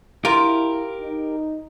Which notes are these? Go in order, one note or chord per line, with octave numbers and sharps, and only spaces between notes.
E4 F4 G4 A#4
D#4